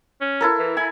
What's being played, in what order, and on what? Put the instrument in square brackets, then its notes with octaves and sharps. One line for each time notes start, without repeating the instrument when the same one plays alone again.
[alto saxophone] C#4
[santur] E4 A4 A#4
[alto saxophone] E3
[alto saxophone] E4 [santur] G#5